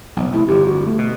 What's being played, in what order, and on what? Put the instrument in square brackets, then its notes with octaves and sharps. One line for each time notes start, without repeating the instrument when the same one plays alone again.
[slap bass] F1 B1
[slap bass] C2 C3 A3 [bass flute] E4
[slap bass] G1 F2 [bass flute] G4
[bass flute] F#4
A3
[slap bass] B2